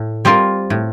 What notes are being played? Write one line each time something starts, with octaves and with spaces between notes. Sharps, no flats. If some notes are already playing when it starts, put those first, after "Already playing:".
Already playing: A2
G3 C4 F4 A#4
A2